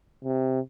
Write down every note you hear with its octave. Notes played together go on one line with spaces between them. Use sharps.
C3